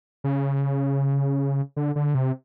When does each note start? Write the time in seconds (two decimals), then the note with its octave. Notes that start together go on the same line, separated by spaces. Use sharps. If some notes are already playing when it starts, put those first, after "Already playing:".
0.24 C#3
1.77 D3
1.96 D3
2.15 C3